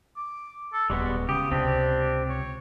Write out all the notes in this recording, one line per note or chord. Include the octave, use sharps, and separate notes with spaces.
D6
A4
D#1 G3 G#3 B3 F#4
C#3 G4 D#6
C#2 C3 C4 D4 G4
C#5